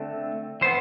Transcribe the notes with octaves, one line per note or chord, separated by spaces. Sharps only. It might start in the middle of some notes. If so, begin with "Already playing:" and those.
Already playing: D3 A3 C4
E3 B3 C5